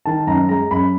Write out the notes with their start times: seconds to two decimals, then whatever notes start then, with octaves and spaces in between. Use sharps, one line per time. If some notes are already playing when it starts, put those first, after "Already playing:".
0.06 D#3 A5
0.27 F#2 A#5
0.49 G#3 A#5
0.71 F#2 B5